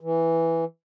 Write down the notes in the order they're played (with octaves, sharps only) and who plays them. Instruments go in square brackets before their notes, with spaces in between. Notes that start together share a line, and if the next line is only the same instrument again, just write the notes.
[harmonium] E3